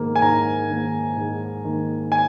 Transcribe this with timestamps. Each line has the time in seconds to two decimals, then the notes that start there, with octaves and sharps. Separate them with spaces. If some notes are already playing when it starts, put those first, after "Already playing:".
Already playing: G#2 D#3 A#3
0.16 G#5
0.22 G#2 A#5
0.70 D#3 A#3
1.17 G#2
1.65 D#3 A#3
2.12 G#5